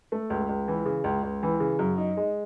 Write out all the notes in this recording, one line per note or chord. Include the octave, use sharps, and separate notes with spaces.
A3
C#2
C#2
E3
C#3
C#2
C#2
E3
C#3
F#2
D#4
G#3